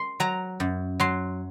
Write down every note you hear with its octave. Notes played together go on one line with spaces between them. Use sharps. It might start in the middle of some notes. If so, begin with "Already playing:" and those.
Already playing: C6
F#3 A#5
F#2
F#3 C6